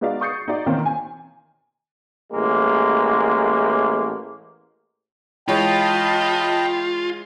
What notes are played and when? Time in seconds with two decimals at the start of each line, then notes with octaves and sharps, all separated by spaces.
0.01 G#3 B3 D#4 F#4 D5 F5
0.21 C#6 D#6 G6 A6 C7 C#7
0.48 D#4 F#4 D5
0.66 B2 D#3 E3 A#3 C4 C#4
0.86 G#5
2.33 A1 G#3 A#3
5.48 E3 G#3 F4 C#5 D#5 G5 A5 B5